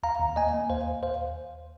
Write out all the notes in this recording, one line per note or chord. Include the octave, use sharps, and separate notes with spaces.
D#2 F5 A#5
D#2
A#3 D#5 G#5
A#3
D#2 C5 F5
D#2
D#2 C5 F5